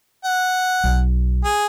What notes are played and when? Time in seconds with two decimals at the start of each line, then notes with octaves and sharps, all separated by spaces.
0.24 F#5
0.84 B1
1.44 G#4